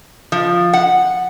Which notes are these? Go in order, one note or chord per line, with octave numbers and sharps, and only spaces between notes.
F3
F#5